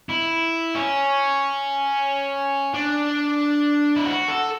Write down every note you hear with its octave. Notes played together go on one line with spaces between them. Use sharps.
E4
C#4
D4
E4
F#4
A4